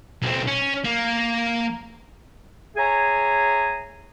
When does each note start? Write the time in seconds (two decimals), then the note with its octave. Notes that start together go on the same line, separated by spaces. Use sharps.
0.22 B1 C4
0.48 C#4
0.84 A#3
2.77 G#4 C#5 E5 G#5 A#5